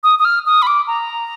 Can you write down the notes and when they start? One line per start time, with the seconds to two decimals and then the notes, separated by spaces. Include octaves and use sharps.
0.03 D#6
0.19 D#6
0.25 F6
0.46 D#6
0.62 B5
0.67 D6
0.87 A#5